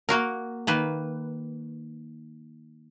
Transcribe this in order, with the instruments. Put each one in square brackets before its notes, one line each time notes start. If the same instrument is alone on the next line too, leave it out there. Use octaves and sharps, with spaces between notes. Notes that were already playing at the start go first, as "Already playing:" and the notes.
[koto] A#3 F#4 A#4
D#3 A#3 B4